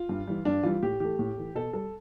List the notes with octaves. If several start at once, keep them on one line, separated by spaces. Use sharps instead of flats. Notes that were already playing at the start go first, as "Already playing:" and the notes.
Already playing: F4
G2
E3 G3
G2 D4
E3 G3 F4
A2 G4
E3 A3 G4
A2
E3 A3
B2 A4
G3 A4